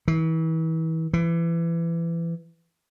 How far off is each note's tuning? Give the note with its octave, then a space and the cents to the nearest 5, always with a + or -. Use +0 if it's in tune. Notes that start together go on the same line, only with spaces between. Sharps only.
E3 -35
E3 +25